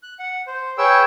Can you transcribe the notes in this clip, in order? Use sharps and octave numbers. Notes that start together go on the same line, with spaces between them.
F#6
F#5
C5
G#4 B4 C#5 G5 E6